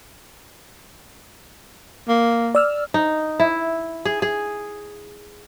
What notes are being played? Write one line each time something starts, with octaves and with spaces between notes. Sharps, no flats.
A#3
D5 E6 F6
D#4
E4
G#4
G#4